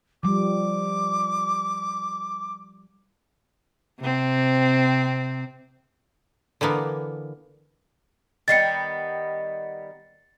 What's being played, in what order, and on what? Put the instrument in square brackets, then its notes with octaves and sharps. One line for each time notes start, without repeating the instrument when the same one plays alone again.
[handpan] F3 G3 [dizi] D6
[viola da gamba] C3 C4
[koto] D3 E3 A#3 B3
[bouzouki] D#3 G3 B3 [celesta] A6 C7 C#7